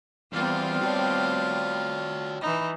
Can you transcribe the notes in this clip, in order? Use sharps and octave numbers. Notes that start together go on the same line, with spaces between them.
E2 G3 B3 C4 F4 F5
F#4 C#5 D5 G5 A5
E3 D#4 B5